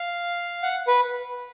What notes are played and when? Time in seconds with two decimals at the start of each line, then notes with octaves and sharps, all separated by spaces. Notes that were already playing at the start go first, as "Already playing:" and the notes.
Already playing: F5
0.63 F#5
0.87 B4